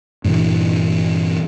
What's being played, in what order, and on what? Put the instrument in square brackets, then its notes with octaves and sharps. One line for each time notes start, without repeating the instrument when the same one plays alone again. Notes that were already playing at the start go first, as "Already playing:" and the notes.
[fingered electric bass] G2 A#2 E3